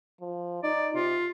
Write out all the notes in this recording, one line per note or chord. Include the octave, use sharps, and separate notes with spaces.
F3
D#4 D5
C3 F4